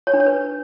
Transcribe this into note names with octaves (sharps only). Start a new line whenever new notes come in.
C#5
D4
C#5
B4